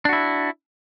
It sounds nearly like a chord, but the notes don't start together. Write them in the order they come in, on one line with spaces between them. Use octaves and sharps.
D4 F#4 E4